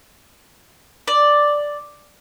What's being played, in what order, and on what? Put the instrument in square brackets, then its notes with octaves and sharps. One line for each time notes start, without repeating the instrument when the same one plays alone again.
[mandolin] D5